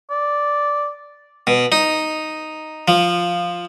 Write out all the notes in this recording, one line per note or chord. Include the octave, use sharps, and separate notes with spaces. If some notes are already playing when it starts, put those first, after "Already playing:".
D5
B2
D#4
F3